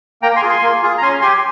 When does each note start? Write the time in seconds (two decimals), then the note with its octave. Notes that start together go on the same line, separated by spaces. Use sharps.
0.22 A#3 G5 A#5
0.36 G#5 C6
0.42 F4 G#4
0.49 G#5 C6
0.62 A#3
0.82 F4 G#4
0.98 A#5
1.02 C#4 G#5 C6
1.21 G4 G#5 C6